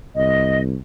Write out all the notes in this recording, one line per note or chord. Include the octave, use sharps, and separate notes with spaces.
C2 D#5